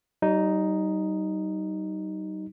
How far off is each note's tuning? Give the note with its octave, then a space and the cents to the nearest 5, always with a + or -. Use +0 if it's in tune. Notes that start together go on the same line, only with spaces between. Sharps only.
G3 -40 D#4 +0